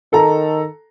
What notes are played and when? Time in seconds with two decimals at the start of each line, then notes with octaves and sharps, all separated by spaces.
0.13 D#3 A4 A#5